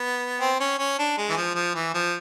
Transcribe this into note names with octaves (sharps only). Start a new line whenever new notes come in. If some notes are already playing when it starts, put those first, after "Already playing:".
Already playing: B3
C4
C#4
C#4
D4
G#3
E3
F3
F3
E3
F3